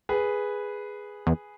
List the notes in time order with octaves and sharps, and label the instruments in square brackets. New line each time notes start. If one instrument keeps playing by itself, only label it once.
[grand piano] G#4 B4
[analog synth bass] E2